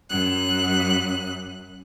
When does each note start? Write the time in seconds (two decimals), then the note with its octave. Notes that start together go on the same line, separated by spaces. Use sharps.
0.10 F#2 F#6